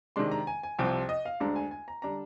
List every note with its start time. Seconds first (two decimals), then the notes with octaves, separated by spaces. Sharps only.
0.16 C3 D#3 G#3 D4 C6
0.31 A#5
0.47 G#5
0.63 G#5
0.79 C2 C3 F3 C4 G5
1.09 D#5
1.25 F5
1.40 D2 D3 G#3 D4 A#5
1.56 G#5
1.71 G#5
1.88 A#5
2.02 D3 G3 D4 A#5